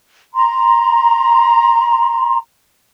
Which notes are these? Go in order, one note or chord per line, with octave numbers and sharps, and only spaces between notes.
A#5 C6